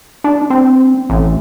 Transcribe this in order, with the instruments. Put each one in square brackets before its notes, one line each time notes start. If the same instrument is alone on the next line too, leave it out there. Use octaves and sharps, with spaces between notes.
[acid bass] D4
C4
A1